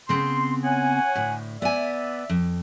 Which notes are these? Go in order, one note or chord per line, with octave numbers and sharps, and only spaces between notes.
C#3 B3 C4 C6
C#5 F#5 G#5
D2 A2
B3 D5 E5 G#5
F2